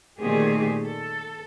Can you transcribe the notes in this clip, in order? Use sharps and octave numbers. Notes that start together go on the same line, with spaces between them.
A#2 D#3 A3 C4 G4 G#4
A4